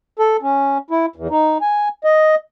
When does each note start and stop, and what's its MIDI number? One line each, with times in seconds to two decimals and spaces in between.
0.19 0.37 69
0.42 0.78 61
0.90 1.06 64
1.16 1.28 40
1.30 1.58 63
1.61 1.88 80
2.04 2.35 75